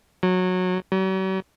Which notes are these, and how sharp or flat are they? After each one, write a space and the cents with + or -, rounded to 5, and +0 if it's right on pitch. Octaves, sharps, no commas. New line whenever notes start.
F#3 -15
F#3 +45